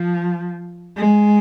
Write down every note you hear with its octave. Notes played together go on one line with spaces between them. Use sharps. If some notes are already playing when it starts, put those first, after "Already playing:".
Already playing: F3
G#3